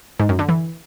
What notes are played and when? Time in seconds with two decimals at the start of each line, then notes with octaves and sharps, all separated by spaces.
0.20 G#2
0.29 F#2
0.39 D3
0.49 E3